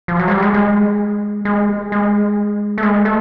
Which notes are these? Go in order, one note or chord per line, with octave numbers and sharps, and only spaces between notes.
F3
F#3
G#3
G3
G#3
G#3
G#3
G#3
A3
G#3
A3